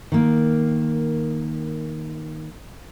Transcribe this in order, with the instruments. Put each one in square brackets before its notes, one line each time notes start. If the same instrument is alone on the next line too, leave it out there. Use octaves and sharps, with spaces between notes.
[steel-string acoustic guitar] D#3 A#3